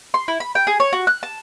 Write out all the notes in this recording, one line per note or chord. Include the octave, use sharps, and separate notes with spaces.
C6
E4
B5
G5
G#4
C#5
F#4
F#6
A5